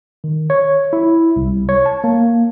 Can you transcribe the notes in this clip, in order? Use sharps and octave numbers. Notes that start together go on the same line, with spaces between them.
D#3
C#5
E4
C2
C#5
A5
A#3